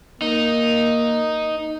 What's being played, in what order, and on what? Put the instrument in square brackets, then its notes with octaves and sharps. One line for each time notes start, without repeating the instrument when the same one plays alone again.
[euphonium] A#3 [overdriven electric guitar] D#4